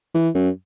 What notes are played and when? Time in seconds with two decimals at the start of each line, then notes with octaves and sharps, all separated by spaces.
0.15 E3
0.35 F#2